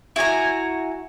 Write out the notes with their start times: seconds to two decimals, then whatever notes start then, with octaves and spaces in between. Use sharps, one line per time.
0.16 E4 F#4 G#5 A#5